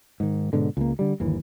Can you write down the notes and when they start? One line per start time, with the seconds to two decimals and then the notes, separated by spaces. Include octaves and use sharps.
0.20 G#2 D#3
0.53 G#2 B2 D3
0.77 C#2 A#3
0.99 D3 G3
1.20 G1 D#2 E3